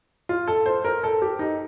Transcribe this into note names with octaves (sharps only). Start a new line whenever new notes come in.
F4
A4
C5
A#4
A4
G4
D#4